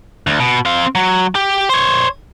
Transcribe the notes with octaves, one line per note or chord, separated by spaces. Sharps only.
D2
B2
C4 F5
F#3
G4
C5 C#5